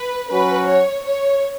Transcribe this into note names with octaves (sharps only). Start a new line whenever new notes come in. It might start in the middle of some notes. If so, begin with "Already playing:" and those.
Already playing: B4
F#3 C#4 F#4 B4
C#5
C#5